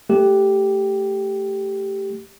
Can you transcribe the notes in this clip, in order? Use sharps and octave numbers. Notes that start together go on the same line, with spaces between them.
A3 G4